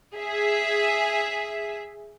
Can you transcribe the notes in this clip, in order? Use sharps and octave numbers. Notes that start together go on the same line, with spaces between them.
G#4 E5